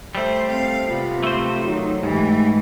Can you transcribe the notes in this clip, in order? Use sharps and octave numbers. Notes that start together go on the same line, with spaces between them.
G3 A3 C5
C4 F5
C3 B3 F4
A3 C5
D#3 F#3
G#2 E3 A3 G4